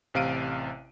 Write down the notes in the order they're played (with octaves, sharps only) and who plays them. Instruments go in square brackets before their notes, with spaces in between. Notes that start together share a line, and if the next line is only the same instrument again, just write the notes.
[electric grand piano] A1 C3 F5 D7 D#7